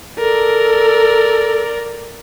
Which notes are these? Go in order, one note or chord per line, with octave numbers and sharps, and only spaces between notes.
A4 A#4 D5